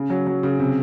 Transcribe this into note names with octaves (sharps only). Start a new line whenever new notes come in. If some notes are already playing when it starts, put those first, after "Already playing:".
Already playing: C#3
F#3
F#3
C#3
C3